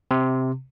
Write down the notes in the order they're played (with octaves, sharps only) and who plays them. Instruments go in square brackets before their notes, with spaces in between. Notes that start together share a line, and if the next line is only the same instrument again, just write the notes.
[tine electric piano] C3